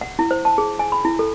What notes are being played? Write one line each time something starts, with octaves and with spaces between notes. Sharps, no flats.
F#5
E4
C5
A5
G#4
G#5
B5
E4
A4